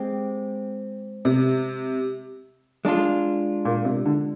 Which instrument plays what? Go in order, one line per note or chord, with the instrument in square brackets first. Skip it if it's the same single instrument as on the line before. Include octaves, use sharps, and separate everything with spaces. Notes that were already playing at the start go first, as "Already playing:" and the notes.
Already playing: [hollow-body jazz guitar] G#3 C4 G4
[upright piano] C3
[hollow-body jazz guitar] G#3 D4 F4
[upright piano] A#2
C3
D3